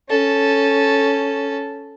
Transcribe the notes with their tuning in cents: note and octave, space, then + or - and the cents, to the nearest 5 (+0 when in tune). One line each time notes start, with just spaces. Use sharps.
C#4 +0 A4 -5